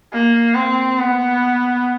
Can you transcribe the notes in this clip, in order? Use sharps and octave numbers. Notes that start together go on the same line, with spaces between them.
A#3
C4
B3